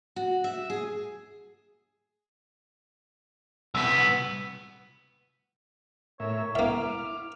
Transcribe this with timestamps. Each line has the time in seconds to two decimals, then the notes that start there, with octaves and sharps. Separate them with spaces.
0.16 F#4
0.44 E5
0.70 G#4
3.75 C2 B3 E6 B6
6.20 A2 A#4 C#5 E5
6.55 A#3 E4 E5 D6 F6